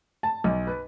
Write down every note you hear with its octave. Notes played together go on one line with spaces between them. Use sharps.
A5
B1
B4